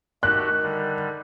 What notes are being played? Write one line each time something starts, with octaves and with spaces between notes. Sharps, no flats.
D#3 A3 F#4 G4 F#6
D3 G3